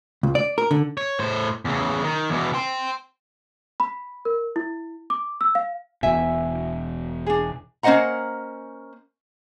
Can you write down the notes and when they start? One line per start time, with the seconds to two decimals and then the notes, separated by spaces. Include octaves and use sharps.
0.23 C#2
0.35 D5
0.58 A#4
0.71 D3
0.97 C#5
1.19 A2 C5
1.65 E2 C#3
2.04 D#3
2.30 E2 B2
2.54 G5 C6
3.80 B5
4.25 A#4
4.56 E4
5.10 D6
5.41 E6
5.55 F5
6.03 E1 B2 E4 E5 G#5
7.26 D4 G#4
7.83 A#3 C#4 C5 D#5 F#5 A#5